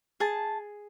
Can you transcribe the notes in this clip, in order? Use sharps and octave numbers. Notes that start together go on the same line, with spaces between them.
G#4 A5